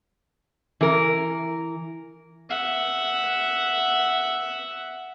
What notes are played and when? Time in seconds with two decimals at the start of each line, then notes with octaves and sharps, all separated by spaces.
0.81 E3 A#4
2.50 E5 F#5